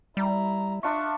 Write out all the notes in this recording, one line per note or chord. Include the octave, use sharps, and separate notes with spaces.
G3 E4 A#5
D4 F4 E5 C#6